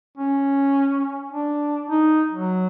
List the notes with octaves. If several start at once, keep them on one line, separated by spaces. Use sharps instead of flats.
C#4
D4
D#4
F#3